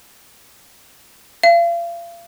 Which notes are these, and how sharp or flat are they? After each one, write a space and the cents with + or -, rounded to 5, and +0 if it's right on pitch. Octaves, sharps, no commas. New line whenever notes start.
F5 -35